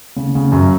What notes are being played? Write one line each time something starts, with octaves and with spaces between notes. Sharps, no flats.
C#3
C#3
F#2